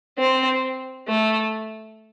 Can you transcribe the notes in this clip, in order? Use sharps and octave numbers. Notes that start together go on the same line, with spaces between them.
C4
A3